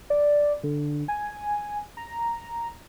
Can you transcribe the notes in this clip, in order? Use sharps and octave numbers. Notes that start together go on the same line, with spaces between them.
D5
D3
G#5
A#5